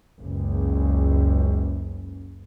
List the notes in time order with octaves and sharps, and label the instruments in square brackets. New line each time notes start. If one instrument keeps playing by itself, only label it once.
[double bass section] F#1 C#2